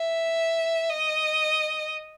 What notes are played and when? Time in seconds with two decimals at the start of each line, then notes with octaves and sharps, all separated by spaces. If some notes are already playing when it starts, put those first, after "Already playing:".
Already playing: E5
0.90 D#5